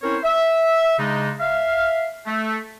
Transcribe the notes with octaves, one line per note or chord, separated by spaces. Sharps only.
C4 C#4 E4 A#4 C5 C#5
E5
C#3 G#3 D4 D#4
E5 F5
A3